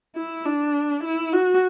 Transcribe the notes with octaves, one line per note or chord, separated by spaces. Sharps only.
E4
D4
E4
F#4